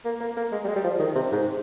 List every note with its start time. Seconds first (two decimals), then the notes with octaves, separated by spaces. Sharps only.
0.05 A#3
0.20 A#3
0.37 A#3
0.52 G#3
0.64 G3
0.68 G#3
0.76 G3
0.84 F3
0.99 D#3
1.15 C3
1.32 G#2